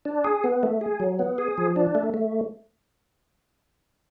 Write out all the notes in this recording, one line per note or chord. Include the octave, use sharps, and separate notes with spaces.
D4
G#4
B3
A3
G#4
F#3
B3
G#4
F3
D4
A3
A3